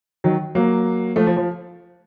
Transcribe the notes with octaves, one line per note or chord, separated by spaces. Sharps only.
D#3 F#3
F#3 A#3
F3 A3
F3
F3